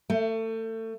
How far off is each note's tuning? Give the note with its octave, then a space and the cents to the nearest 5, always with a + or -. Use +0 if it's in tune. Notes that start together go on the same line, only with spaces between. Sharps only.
A3 +30